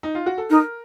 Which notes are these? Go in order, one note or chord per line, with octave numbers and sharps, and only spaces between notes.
D#4
F4
F#4
A4
D#4 A#4